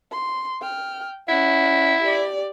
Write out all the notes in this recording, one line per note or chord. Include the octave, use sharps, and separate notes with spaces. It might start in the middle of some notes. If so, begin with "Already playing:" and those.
C6
G5 F6
C#4 E4 F#5
G4 D5